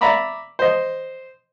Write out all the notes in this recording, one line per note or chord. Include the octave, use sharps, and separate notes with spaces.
D5 E5 A#5 B5 D6
C5 D#5